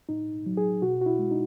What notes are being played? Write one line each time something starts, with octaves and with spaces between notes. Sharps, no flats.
A2 D#4
F#3
G#4
B2 F#4
F#4
E4
G#3
D#4